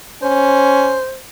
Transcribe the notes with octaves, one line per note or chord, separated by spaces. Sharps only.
C#4 C5